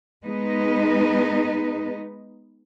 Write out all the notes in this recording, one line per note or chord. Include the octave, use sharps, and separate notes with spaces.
G#3 B3 D#4 B4 D#5